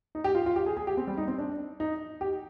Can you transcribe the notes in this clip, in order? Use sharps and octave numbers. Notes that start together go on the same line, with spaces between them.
D#4
G4
F4
F4
G4
G#4
G#4
G4
C4
G3
D#4
C4
D4
D#4
G4